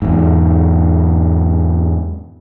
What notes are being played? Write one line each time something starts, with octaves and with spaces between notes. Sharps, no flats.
E2 G#2